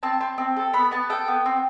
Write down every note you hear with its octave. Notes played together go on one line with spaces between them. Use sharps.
C4 A5
C4
C4
A4
B3 B5
B3 A5
A4 G5
B3
C4